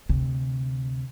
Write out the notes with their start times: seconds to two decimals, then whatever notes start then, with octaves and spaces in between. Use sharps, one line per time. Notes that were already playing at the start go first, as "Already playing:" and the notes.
0.09 D2 C3